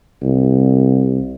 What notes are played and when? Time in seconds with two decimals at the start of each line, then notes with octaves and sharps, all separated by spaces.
0.23 C2